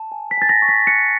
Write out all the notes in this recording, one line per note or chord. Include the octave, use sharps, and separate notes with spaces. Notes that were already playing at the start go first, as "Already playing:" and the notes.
Already playing: A5
G#5
B6
G#5 A6
A#6
C#6
B6
F#6 C#7